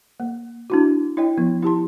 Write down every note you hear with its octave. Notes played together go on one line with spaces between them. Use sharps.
A#3
D4 E4 F#4
E4 C#5 D#5 G5
F3 B3
E4 G4 A5 C6